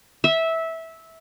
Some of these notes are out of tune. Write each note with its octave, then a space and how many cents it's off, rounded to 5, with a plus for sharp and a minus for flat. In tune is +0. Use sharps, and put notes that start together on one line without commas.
E5 -15